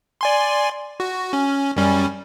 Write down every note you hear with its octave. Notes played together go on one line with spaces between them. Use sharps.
D5 G#5 C6
F#4
C#4
F#2 G3 C#4